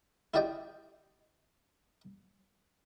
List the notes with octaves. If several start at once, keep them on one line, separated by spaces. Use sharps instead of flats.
E4 F4 G4 D5 D#5 G5